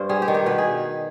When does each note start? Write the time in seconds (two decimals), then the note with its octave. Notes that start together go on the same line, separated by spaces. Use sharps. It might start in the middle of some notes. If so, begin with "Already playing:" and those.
Already playing: G2 C5
0.09 G3 G#4
0.22 G4
0.28 D#3
0.34 G4
0.46 B2 B4
0.58 G#4